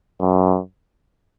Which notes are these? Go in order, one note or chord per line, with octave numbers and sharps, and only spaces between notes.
F#2